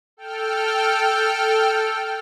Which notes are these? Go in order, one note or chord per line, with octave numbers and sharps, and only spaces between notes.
A4 G5 F6